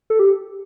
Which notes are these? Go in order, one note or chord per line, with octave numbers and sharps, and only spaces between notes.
A4
G4